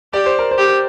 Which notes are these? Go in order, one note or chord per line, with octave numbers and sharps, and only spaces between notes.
G4 D5
C5
A#4
C5
G4